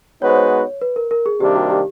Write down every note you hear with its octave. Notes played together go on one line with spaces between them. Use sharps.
G#3 B3 D#4 F#4 B4 C#5
C5
C#5
B4
A#4
A#4
G#4
C3 D#3 G3 A#3 D4 G4
F#4
G4